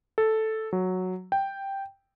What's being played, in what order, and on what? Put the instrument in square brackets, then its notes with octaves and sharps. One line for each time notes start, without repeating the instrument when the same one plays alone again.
[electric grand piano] A4
F#3
G5